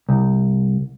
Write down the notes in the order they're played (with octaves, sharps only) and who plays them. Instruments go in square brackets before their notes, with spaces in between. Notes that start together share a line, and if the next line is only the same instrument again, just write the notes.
[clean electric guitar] C2